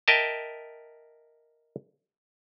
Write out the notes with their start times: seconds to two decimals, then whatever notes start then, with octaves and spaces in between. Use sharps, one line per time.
0.08 A#4 D#5 E5 G5 A5